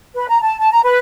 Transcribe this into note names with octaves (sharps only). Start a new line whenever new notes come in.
B4
A#5
A5
A5
A#5
B4